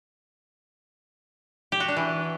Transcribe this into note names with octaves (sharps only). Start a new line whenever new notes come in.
G4
F#4
D4
E3